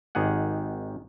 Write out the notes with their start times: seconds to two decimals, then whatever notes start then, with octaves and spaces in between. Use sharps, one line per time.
0.15 G#1 D#3 G4 G#4 F#5